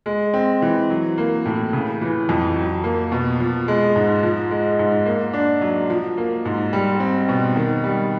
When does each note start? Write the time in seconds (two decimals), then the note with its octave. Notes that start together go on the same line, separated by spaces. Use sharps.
0.06 G#3
0.34 C4
0.62 E3
0.90 F#3
1.18 A#3
1.46 A2
1.73 C#3
2.01 E3
2.29 F2
2.56 F#3
2.84 A#3
3.12 B2
3.40 F3
3.68 G#3
3.96 G#2
4.23 F3
4.51 G#3
4.79 G#2
5.06 A#3
5.33 D4
5.61 F#3
5.90 F3
6.17 A#3
6.45 G#2
6.73 G3
7.00 C4
7.29 B2
7.56 D#3
7.84 G3